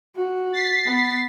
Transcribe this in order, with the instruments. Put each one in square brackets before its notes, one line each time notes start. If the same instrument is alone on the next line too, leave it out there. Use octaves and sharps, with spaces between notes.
[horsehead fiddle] F#4
[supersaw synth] A6 B6 C7
[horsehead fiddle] B3